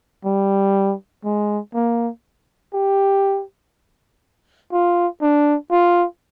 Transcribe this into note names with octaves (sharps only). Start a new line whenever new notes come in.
G3
G#3
A#3
G4
F4
D4
F4